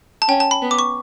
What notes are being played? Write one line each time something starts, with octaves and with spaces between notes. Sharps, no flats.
A5
C#4 G5
A5
B5
B3
D6
C#6